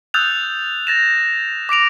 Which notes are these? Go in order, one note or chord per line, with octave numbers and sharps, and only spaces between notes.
D#6 E6 F#6 G6 A6 F7
A6 A#6 E7
D6 A#6 D7 F7